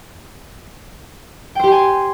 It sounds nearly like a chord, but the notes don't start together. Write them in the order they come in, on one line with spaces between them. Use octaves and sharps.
G5 C5 G4 C6 G#5